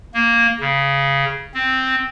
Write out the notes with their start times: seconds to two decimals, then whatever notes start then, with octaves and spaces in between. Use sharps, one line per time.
0.14 A#3
0.61 C#3
1.54 C4